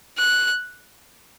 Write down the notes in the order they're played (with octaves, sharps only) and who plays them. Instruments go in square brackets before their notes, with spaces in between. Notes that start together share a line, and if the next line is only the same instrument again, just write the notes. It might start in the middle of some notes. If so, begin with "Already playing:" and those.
[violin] F#6